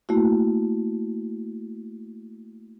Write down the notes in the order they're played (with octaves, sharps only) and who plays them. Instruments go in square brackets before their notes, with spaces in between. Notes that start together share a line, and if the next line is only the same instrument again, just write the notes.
[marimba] A3 A#3 E4 F#4